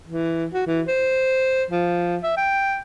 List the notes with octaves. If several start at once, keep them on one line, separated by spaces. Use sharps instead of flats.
E3
F#4
E3
C5
F3
E5
G5